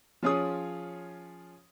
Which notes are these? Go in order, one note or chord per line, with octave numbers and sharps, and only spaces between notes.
F3 C#4 F4 G#4 C#5 D#6